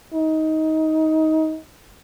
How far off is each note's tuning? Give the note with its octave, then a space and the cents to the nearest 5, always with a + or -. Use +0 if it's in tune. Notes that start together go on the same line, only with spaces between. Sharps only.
D#4 +20